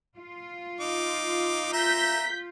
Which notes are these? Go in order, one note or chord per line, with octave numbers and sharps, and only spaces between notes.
F4
D#4 D6
E5 A#5 G6 B6